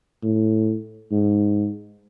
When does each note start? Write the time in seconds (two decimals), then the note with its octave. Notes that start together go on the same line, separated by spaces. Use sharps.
0.23 A2
1.12 G#2